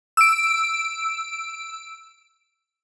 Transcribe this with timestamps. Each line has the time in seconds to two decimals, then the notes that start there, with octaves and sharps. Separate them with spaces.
0.17 E6 D7